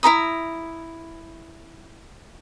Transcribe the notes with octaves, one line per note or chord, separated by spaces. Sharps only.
E4 A4 A#5 D#6